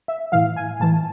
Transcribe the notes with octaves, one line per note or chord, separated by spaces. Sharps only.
E5
A2 E3 F5
G#5
A2 E3 A5